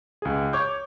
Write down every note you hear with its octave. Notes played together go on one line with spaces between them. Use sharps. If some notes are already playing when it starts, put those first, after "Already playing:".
C#2 G#4
C#5 C#6 D6 G6